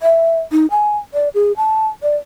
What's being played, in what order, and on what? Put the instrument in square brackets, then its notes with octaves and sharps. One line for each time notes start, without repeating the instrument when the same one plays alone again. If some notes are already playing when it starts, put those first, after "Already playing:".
[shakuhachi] E5
D#4
G#5
D5
G#4
A5
D5